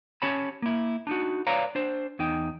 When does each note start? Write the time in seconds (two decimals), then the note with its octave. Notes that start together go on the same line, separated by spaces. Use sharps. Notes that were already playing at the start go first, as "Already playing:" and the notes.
0.22 C#4 G4 C#5 A5 B5
0.62 A#3 E4
1.07 D4 D#4 F#4
1.47 B4 C#5 D5 F5 A#5
1.75 D4 C5
2.19 E2 D#4 G5